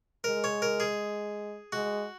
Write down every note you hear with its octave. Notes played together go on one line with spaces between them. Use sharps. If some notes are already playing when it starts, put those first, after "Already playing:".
G#3 A#4
C#5
A#4
G#4
G#3 F#4